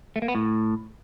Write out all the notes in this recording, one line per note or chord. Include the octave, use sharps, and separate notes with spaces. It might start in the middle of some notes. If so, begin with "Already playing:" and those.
A3
A#3
B3
A2